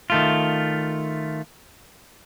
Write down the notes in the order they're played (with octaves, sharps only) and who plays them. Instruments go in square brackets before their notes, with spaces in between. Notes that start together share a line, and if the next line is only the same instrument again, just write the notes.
[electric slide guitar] D#3 A3 F4